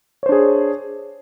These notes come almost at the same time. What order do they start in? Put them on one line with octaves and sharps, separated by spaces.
C#5 C5 D4 G#4